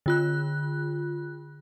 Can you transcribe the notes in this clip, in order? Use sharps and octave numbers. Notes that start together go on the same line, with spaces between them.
D3 F4 F#6